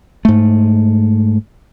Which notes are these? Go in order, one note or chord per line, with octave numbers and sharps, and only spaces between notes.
G#2 A3